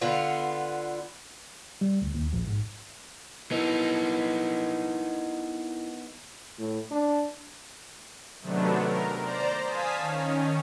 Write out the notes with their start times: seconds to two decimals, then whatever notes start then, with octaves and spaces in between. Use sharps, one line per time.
0.01 D3 B3 F4
1.81 G3
2.02 D2
2.14 D#2
2.33 A#1
2.47 G#2
3.51 B3 D#4 E4 A#4
6.59 A2
6.91 D4
8.41 C3 D#3 F#3 A3 B3 D4
8.82 A#4
9.18 C5 D5 A#5
9.64 F5 G#5 A5 D#6 B6
9.97 D#3 C#4